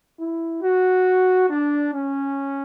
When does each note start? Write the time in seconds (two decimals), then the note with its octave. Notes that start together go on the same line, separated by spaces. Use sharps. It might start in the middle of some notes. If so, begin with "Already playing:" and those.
0.19 E4
0.63 F#4
1.50 D4
1.93 C#4